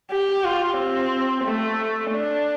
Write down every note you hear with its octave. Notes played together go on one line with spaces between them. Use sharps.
G4
F4
C4
A3
D4